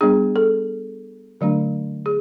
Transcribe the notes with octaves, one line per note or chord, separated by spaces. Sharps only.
G3 B3 D4 G#4
A4
D3 F#3 A3 D4
G#4